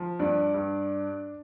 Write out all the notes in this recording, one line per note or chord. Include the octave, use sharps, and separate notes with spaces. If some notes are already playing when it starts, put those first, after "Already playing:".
Already playing: F3
G2 D4 D5
G2